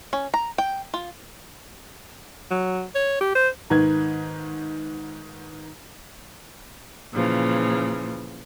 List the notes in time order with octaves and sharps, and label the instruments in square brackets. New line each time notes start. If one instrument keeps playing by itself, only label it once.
[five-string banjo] C#4
A#5
G5
F4
[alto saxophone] F#3
C#5
G4
C5
[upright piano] G#2 D#3 B4 G#6
[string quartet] A#2 C#3 E3 F3